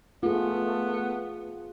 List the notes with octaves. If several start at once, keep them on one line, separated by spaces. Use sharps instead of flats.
A3 B3 F4 G#4